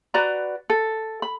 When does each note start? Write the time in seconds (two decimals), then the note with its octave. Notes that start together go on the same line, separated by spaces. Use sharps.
0.14 F#4 B4 D5 A#5
0.70 A4
1.22 B5